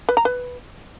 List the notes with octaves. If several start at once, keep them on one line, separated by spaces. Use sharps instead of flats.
B4
A#5
B4